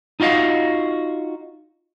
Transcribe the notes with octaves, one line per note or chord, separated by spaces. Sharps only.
D#4 F4 F#4 D#5 F5